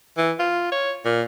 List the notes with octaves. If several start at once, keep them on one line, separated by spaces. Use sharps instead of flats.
E3
F4
C#5
A#2